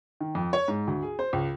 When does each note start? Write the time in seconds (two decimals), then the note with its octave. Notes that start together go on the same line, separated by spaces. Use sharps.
0.21 D#3
0.35 F2
0.53 C#5
0.68 G#2
0.87 D2
1.03 G#4
1.19 C5
1.33 C#2